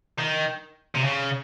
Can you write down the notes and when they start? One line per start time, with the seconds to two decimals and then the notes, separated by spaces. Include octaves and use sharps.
0.19 D#3
0.95 C3
1.04 C#3